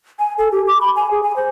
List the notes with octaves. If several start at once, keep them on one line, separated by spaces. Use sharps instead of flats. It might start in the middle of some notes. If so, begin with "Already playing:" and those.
G#5
A4
G4
D6
B5
G#5
G#4
G#5
C5